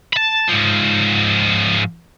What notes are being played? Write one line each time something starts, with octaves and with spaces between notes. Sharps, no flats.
A5 B5
G#2 F3